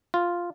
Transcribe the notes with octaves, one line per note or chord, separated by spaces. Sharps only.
F4